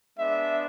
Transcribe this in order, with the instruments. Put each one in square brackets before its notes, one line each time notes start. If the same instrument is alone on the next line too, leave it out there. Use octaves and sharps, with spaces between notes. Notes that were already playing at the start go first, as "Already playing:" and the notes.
[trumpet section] G#3 B3 D4 E5